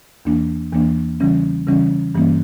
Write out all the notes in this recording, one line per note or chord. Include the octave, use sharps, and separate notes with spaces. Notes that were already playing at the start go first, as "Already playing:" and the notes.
E2 E3 A#3 D4
E2 E3 A#3 D4
C#3 E3 G3 C#4
C#3 E3 G3 C#4
G2 E3 G3 A#3 C#4